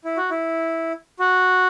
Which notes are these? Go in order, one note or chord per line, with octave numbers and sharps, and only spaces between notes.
E4
F#4
E4
F#4